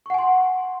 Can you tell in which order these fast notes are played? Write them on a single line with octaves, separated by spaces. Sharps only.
C#6 F#5 G#5 C6